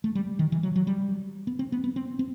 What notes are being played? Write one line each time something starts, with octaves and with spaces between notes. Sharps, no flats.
A3
G3
D#3
E3
F#3
F#3
G3
B3
C4
B3
B3
C4
C4